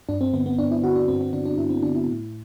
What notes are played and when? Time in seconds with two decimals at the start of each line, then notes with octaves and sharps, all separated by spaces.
0.09 G2 D4
0.21 C4
0.33 D3 B3
0.46 B3
0.59 G2 D4
0.71 E4
0.83 D3 F#4
0.95 D4
1.08 G2 C4
1.21 C4
1.33 D3 D4
1.45 D4
1.58 G2 E4
1.70 C4
1.82 D3 D4
1.95 E4
2.08 A2